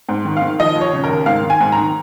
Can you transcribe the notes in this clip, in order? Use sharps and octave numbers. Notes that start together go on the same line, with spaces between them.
G#2
D#3
F5
D#3
F3 D#5
D#2
C#5
C#3
A#4
D#2
G#2 F5
D#3
G#5
G#2
A#5
D#3